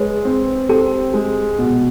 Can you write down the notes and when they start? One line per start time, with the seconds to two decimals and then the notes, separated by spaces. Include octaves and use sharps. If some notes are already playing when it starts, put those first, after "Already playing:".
Already playing: G#3 B4 C#5
0.25 C4
0.69 C4 G4 A4
1.14 G#3
1.58 B2